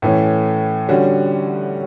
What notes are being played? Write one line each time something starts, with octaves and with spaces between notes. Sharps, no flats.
A2 E3 A3 C#4
D3 G3 C#4 F#4